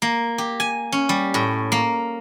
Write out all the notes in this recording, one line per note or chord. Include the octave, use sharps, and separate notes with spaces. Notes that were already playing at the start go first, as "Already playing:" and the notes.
A#3
G4
G#5
C#4
G3
A2
A#3